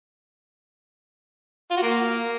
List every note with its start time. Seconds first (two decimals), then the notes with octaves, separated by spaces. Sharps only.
1.71 F4
1.77 F#4
1.83 A#3